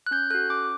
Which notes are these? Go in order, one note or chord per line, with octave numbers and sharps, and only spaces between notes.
F#6
C#4 G6
F#4 A4 F#6
C#4 D6